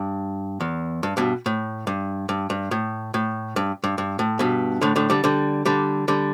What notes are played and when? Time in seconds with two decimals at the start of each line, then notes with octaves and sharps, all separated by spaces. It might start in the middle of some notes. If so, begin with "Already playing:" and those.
Already playing: G2
0.60 E2
1.03 G2
1.17 G2 B2
1.46 A2
1.87 G2
2.29 G2
2.50 G2
2.71 A2
3.14 A2
3.56 G2
3.84 G2
3.98 G2
4.19 A2
4.39 G2 B2
4.81 A2 D3
4.96 A2 D3
5.10 D3 G3
5.24 D3 G3
5.65 D3 G3
6.08 D3 G3